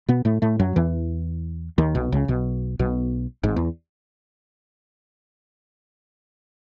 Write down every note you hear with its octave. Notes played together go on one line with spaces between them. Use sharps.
B2 B3
A2 A3
A2 A3
F#2 F#3
E2 E3
D#2 D#3
B1 B2
C#2 C#3
B1 B2
B1 B2
G#1 G#2
E2